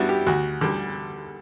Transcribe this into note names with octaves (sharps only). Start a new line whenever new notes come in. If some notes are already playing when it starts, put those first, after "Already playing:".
Already playing: G3 B3 D4 E4 F#4
G4
D2 F#4
D3 G3